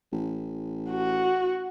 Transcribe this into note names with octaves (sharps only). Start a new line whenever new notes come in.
A1
F#4